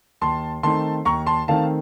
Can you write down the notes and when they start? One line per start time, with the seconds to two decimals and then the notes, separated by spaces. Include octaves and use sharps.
0.21 D#2 A5 C6
0.63 D#3 A3 C4 D#4 A5 C6
1.05 D#2 A#5 C#6
1.26 A5 C6
1.48 D#3 A3 C4 D#4 F5 A5